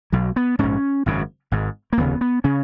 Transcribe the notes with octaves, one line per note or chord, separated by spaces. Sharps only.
B1 B2 F#3
B3
A#1 G#2 C#4
G#1 F#2 C#3
G#1 G#2
A#3
F1 D#2 C#3 B3
B3
C#3 C#4